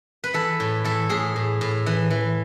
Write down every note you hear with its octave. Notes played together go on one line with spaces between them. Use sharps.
B4
E3 A4
A2
E3 A4
A2 G#4
A2
A2
E3
E3